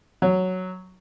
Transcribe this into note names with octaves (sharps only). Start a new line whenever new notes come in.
F#3